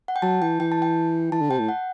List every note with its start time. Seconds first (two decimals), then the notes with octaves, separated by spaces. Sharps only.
0.08 F#5
0.16 G5
0.22 F#3 A5
0.41 E3 G5
0.60 E3 G5
0.72 A5
0.82 G5
1.32 E3 A5
1.41 D3
1.50 C3 G5
1.59 A2
1.68 F#5